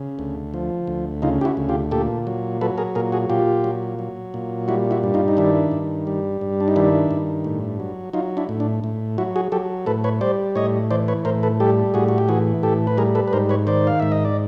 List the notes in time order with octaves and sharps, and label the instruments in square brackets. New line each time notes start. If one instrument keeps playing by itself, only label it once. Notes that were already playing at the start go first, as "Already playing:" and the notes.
Already playing: [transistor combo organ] C#3
D2
F3
D2
C#3 D#4 F4
G4
E4 F#4
D2
F4 G4
A#2 G4 A4
F#3
F#3 A4 B4
G#4 A#4
A#2 G#4 A#4
F#4 G#4
A#2 F4 G4
F#3
F#3
A#2
G3 E4 F#4
E4 F#4
G2
D#4 F4
D#4
D#3 D4 E4
G2
G3
G2
D4
D#4
D#3 D4 E4
G2
A2
F#3
F#3 D#4 F4
D4 E4
A2
D4
A2
F#3 E4 F#4
F#4 G#4
F#3 G4 A4
A2 A4 B4
B4 C#5
G3 C5 D5
A2 C#5 D#5
E3 C5 D5
B4 C#5
A2 A#4 C5
A4 B4
G3 G4 A4
A2 F#4 G#4
F#4
G4
E3 F#4 G#4
A2 G4 A4
B4
G3 G#4 A#4
A4 B4
B4
G#2 A#4 C5
B4 C#5
D#3 C5 D5
F5
G#2 E5
D#5
D5